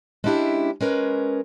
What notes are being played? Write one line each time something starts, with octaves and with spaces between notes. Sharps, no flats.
G#3 C#4 D4 E4 G4 E5
G#3 C#4 A#4 B4